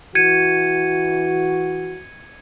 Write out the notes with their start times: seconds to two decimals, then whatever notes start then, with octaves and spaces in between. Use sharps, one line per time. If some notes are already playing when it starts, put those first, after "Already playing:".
0.15 E3 F#4 G#6 C#7 D#7